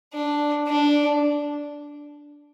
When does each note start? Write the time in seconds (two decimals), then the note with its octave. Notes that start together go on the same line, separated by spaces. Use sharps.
0.14 D4
0.68 D4